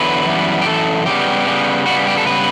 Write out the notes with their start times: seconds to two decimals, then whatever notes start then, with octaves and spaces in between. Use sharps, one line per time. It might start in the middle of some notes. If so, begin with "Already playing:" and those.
Already playing: E2 D3 F#3 B4
0.25 F#2 E3 G3 B3
0.62 G4
0.67 F#2 E3 A4
1.06 C#3 G3 B3 G4
1.47 C#3 G3 B3
1.86 C#3 G3 B3 F#4
2.07 G4
2.17 A4
2.26 C#3 G3 B3 B4